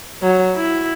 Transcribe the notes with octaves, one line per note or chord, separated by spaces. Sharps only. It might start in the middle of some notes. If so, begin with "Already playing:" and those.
F#3
E4